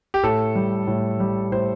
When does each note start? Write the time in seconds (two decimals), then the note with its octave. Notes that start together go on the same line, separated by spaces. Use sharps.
0.14 G4
0.23 A2 A4
0.55 G3
0.87 A2
1.20 G3
1.52 A2 C5